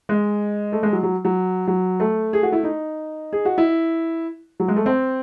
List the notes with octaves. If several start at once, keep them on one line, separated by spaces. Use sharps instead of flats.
G#3
A3
G#3
F#3
F#3
F#3
F#3
A3
G#4
F#4
E4
D#4
G#4
F#4
E4
F#3
G#3
A3
C4